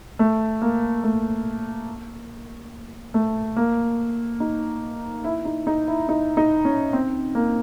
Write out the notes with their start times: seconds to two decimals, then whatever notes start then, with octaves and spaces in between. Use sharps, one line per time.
0.19 A3
0.62 A#3
1.04 A3
3.14 A3
3.56 A#3
4.40 D#4
5.24 E4
5.45 D#4
5.67 D#4
5.88 E4
6.09 D#4
6.37 D#4
6.65 C#4
6.93 C4
7.35 A#3